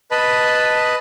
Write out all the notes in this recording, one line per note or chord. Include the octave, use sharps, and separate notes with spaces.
B4 D#5 A5 B5